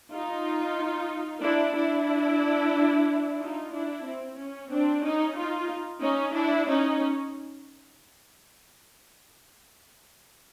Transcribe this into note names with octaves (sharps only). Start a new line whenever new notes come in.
D#4 F4
D4 E4
D4 E4
D#4 F4
D4 E4
C4
C#4
C4 D4
C#4 D#4
D#4 F4
C#4 D#4
D4 E4
C#4 D#4